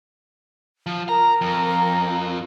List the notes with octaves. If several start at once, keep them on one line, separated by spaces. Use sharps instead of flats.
F3
A#4 A#5
F2